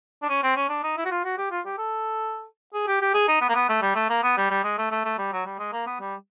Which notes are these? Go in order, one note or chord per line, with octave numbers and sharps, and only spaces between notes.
D4
C#4
C4
C#4
D4
D#4
E4
F#4
F4
F#4
G4
F4
G4
A4
G#4
G4
G4
G#4
D#4
B3
A#3
B3
A3
G3
A3
A#3
B3
G3
G3
G#3
A3
A3
A3
G3
F#3
G3
G#3
A#3
B3
G3